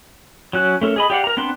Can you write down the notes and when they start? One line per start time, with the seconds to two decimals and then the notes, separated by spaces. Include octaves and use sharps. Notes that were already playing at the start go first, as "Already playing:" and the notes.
0.53 F#3 C#4 F#6
0.81 A3 C#4 A4 A#4
0.96 G#4 D#5 B5
1.10 G4 D5 F5 F#5
1.24 A#4 A#5
1.37 B3 C4 D4 C6 F#6